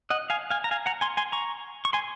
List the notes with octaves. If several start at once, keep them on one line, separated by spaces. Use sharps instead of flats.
D#5 F#5
F5 G#5
F5 G#5
A#5
F5 G#5
F#5 A#5
G#5 C6
G#5 C6
A#5 C#6
C#6
G#5 C6